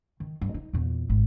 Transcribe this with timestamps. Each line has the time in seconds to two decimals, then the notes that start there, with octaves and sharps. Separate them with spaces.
0.20 D#3
0.41 G2
0.54 D#4
0.73 E2 A#2
1.09 G#1